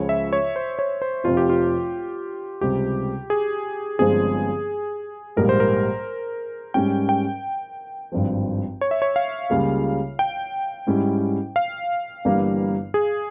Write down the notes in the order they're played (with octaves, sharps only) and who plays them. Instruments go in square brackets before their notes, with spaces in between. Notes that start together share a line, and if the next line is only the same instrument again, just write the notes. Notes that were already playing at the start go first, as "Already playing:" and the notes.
Already playing: [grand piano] C#2 C#3 F3 [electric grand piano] C#5
[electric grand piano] E5
C#5
C5
C#5
C5
[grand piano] F1 F2 C3 F3 [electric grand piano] F4
[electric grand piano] G4
F4
[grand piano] C#2 C3 G3 [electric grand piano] G4
[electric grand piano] G#4
[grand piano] G1 G2 F3 G#3 C4 [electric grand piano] G#4
[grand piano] A#1 G#2 G3 A#3 [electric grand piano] A#4
[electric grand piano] C5
A#4
[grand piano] G#2 G3 C#4 [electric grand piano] G5
[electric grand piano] G5
[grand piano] G#1 G2 F3
[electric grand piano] C#5
E5
C#5
F5
[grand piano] C#2 C#3 G3 A#3 F4
[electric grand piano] G5
[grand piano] G#2 G3 C#4 E4
[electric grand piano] F5
[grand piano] G1 G2 E3 G3 A#3
[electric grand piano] G#4